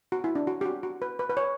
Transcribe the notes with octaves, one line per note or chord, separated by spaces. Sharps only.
F#4
E4
D4
F#4
G4
F#4
F#4
B4
B4
B4
C#5